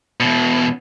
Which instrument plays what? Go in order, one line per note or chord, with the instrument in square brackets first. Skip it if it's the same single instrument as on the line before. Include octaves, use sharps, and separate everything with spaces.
[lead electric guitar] E2 B2